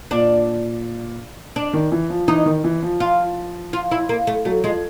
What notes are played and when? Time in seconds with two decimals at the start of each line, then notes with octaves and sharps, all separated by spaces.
0.11 A#2 D4
1.56 D4
1.73 D#3
1.92 E3
2.10 F3
2.28 E3 D#4
2.46 D#3
2.64 E3
2.83 F3
3.00 F4
3.73 F4
3.91 E4
4.09 A#3
4.27 A3
4.45 F#3 A3
4.64 F3 G#3